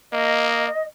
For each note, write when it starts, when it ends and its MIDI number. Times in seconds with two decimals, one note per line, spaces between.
0.13 0.68 58
0.13 0.83 75